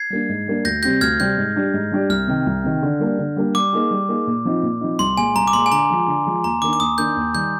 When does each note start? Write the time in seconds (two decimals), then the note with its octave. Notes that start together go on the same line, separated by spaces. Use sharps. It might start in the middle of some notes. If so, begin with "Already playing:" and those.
Already playing: G#6 C7
0.10 G3 A#3 D4
0.29 G#2
0.47 G3 A#3 D4
0.65 D2 G6 A#6
0.83 C3 G3 C4 G4 G6 A#6
1.01 D2 F6 G#6
1.20 C3 G3 C4 G4 G6
1.38 G#2
1.56 G3 D4 G4 D5
1.74 G#2
1.92 G3 D4 G4 D5
2.09 C2 F6
2.28 C3 D#3
2.46 C2
2.64 C3 D#3
2.83 D3
3.00 G3 A#3 D4
3.19 D3
3.36 G3 A#3 D4
3.55 G3 D6
3.73 A#3 D#4 G#4
3.91 G3
4.09 A#3 D#4 G#4
4.27 A#2
4.45 F3 C4 D#4
4.63 A#2
4.81 F3 C4 D#4
4.99 C2 C6
5.17 A#2 G#3 G#5
5.35 C2 A#5
5.48 D6
5.53 A#2 G#3 C6
5.66 G#5
5.71 D3 A#5
5.90 F3 G#3
6.08 D3
6.26 F3 G#3
6.44 D#2 A#5
6.62 D#3 A#3 D4 D6
6.73 D6
6.80 D#2 D#6
6.98 D#3 A#3 D4 G6
7.16 D#2
7.34 D#3 G3 G6